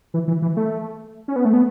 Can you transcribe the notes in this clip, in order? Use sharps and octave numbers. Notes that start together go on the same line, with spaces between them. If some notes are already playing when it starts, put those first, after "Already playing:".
E3
E3
E3
A3
C#4
B3
A3
B3